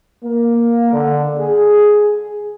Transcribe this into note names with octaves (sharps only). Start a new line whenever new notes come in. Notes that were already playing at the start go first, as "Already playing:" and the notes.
A#3
D3
G#4